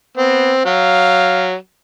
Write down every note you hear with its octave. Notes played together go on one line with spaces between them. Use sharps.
B3 C4
F#3 F5